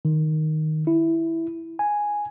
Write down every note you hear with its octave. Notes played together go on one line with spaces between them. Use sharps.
D#3
E4
G#5